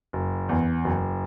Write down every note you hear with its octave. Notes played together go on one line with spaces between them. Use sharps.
F#1
E2
F#1